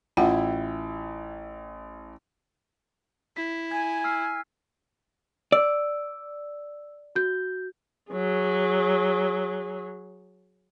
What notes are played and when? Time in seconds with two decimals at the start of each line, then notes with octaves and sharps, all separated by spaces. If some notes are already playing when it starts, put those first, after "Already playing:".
0.17 A1 E4 F4 F#5 G5
3.37 E4 B6
3.71 G#5 G#6
4.04 E6 F6 C7
5.52 D5 E6
7.15 F#4 G6
8.11 F#3 G#4